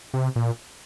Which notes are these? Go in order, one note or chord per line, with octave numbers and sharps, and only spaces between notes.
C3
A#2